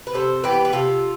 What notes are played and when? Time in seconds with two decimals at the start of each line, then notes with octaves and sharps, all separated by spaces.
0.07 B4
0.14 C3 A4 C5
0.44 E3 B3 G4 B4
0.65 B4
0.72 C3 F4 A4